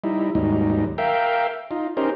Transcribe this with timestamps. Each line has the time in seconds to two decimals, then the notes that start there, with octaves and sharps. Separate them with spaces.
0.04 G3 D#4 E4
0.35 D#2 G#2 F#3 G3 D#4
0.98 A#4 E5 F5 G5
1.71 D#4 F4
1.97 C#4 D#4 G4 A#4 C5